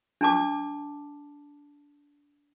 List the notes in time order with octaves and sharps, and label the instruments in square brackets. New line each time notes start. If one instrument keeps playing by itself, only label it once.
[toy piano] D4 A5 D6